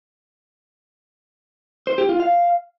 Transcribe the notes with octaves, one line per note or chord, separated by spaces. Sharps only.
C5
G4
F4
F5